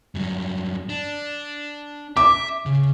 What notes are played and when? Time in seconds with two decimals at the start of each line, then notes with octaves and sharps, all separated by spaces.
0.15 G2 F#3
0.89 D4
2.17 E5 D6
2.66 C#3